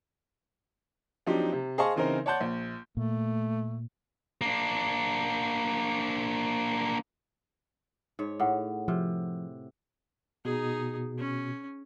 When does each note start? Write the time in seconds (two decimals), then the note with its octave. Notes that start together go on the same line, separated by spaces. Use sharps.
1.26 F3 F#3 C4 D4 D#4 G4
1.52 C3
1.78 G#4 C5 D#5 F5 A5 C#6
1.96 C#3 E3 C4 D#4 A#4 C5
2.26 C#5 D5 F#5 A5 C6 G6
2.40 A#1
2.97 A#2 A3
4.41 A#3 D4
8.19 G#2 C#5
8.40 A2 G#4 F#5
8.88 C3 F3
10.45 B2 D#4 G#4
11.18 C#4